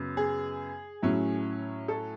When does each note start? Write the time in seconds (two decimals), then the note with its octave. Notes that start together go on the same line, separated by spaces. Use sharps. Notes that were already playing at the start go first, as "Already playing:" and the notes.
Already playing: F#2 C#3 B3
0.17 G#4
1.02 A2 F#3 C#4 E4
1.88 A4